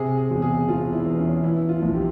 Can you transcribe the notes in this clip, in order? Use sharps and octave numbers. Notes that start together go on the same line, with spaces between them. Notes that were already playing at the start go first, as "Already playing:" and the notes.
Already playing: C3 G#4
G#4
E1
G#4
E1 F4
E4
E2
C#4
E3 E4
F4
A#1
G4